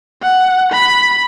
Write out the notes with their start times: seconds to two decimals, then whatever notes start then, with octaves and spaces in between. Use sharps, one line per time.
0.22 F#5
0.72 B5